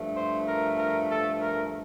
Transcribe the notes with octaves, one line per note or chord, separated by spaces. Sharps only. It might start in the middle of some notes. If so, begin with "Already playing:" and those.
Already playing: G2 F3 A3
C5
A#4
A#4
A4
A#4